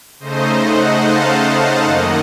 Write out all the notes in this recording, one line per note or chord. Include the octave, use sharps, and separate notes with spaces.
C#3 A3 D#4 C5 D#5
D#5 F#5
F5 A5
D#5 F#5
F#2 D#3 A#3 D#4